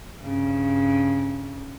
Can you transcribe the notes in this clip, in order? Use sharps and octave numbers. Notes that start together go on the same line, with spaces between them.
G2 C#3